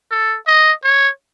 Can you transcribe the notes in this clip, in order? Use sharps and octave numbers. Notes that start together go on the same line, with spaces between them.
A4
D#5
C#5